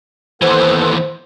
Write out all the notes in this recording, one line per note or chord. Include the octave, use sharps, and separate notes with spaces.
D#2 E3 B3 A4 B4 C5